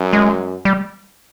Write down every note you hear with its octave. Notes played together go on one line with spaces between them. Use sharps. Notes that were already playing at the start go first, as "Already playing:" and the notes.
Already playing: F#2
G#3
G3